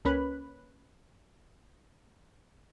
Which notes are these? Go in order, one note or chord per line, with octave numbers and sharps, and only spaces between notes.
C#2 A#3 C#4 B4 B5 F#6